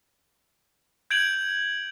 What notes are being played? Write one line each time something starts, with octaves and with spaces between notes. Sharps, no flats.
G6 G#6 D7 F#7